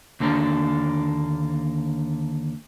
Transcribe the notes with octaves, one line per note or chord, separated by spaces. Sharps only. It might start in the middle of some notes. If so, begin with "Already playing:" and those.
D#2 D3 A#3 D4